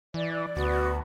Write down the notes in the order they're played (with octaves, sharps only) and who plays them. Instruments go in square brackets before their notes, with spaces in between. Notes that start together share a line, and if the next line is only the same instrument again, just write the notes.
[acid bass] E3 [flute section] D5
[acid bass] D2 [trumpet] B3 [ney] F#4